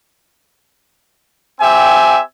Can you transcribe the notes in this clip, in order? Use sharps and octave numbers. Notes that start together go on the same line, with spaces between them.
C4 G4 E5 G#5